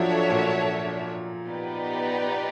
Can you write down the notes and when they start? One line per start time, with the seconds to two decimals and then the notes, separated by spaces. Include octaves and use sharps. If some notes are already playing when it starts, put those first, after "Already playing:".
Already playing: F3 F#3 D4 F#4 A4 C#5 E5
0.29 A#2
1.47 B3 D#4 G4 B4 D5